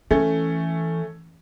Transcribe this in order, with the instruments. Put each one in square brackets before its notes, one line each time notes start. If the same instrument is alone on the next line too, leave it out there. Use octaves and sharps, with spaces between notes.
[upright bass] E3 [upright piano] A3 C#4